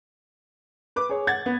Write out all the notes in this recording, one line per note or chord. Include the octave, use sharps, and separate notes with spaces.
B4 D6
G#4 C#5
F#5 G#6 A6
B3